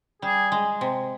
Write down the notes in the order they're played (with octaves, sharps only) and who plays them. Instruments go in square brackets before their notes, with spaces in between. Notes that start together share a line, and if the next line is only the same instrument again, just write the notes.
[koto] G3 [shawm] G#4
[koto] G#3
C3